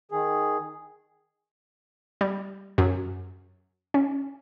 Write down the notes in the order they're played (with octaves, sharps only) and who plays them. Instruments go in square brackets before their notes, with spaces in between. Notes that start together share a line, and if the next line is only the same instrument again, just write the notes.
[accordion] D#3 G#4
[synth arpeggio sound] G3
F#2
C#4